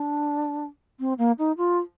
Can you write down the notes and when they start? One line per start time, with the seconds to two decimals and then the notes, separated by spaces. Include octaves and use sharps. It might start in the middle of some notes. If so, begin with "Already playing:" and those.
Already playing: D4
1.00 C4
1.18 A#3
1.39 D#4
1.58 F4